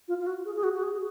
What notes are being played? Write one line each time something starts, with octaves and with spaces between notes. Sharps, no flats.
F4
F4
F#4
G#4
G#4
F#4
F#4
G#4